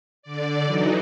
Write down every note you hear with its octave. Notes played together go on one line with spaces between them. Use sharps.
D3 D5
E3 F#3 D#4